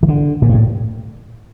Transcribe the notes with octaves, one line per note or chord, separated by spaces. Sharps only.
E3
D3
A#2
G2
A2